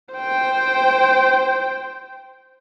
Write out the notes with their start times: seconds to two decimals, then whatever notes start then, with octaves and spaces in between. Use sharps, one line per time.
0.14 C5 G5